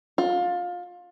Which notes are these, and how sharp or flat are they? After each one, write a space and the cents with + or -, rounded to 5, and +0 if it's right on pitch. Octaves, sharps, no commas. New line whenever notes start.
F4 +25